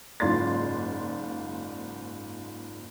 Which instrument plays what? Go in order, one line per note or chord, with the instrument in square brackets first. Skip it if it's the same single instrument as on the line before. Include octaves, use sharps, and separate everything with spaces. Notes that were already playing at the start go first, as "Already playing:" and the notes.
[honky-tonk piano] F#1 G#2 F4 D5 C6 A6